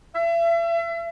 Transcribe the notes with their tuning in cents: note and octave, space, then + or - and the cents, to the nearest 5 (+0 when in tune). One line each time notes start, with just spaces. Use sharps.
E5 +35